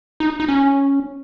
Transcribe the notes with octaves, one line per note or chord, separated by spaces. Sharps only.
D#4
D#4
C#4